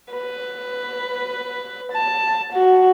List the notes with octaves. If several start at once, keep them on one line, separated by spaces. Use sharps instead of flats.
B4
A5
F#4